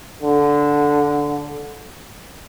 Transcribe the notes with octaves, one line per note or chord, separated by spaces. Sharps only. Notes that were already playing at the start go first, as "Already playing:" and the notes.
D3